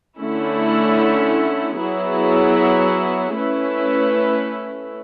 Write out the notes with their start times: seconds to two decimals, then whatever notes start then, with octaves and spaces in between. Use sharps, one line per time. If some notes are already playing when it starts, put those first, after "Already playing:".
0.19 D3 A3 C#4 E4
1.77 F#3 B3 E4 G#4
3.36 A3 C#4 E4 B4